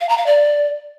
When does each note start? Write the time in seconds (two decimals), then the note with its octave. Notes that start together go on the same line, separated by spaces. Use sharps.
0.01 F5
0.09 A#5
0.18 F5
0.26 D5